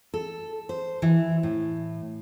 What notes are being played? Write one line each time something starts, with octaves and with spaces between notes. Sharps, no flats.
A4
C5
E3
A2